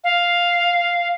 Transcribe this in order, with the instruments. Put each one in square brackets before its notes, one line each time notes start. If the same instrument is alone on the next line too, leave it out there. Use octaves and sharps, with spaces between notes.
[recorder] F5